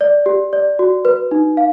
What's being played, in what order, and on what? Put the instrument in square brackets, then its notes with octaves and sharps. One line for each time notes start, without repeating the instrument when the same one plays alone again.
[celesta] D5
G4
D5
F#4
B4
D#4
F5